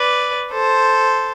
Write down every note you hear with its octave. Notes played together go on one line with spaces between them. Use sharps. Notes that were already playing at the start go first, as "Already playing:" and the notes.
Already playing: B4 D5
A4 C5